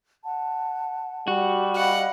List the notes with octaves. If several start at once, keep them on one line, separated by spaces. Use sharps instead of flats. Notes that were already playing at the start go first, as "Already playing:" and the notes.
F#5 A5
G3 F#4
D#5 F5 F#5 B5